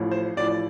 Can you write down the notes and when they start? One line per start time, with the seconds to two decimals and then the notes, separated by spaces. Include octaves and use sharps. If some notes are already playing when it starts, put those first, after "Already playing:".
Already playing: A1 A2 F3
0.11 C5
0.37 A1 A2 F3 D5